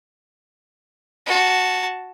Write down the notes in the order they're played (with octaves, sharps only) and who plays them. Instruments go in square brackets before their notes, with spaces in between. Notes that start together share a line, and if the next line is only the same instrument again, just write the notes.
[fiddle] F#4 A5